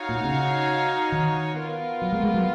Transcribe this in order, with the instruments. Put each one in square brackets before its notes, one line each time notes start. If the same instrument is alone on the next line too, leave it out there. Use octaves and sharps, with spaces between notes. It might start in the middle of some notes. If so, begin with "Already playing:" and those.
Already playing: [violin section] D#4 F#4 C#5 F5
[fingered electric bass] A#2
C#3
D#3
[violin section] B3 F4 A#4
[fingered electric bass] F#3
G#3
G#3
F#3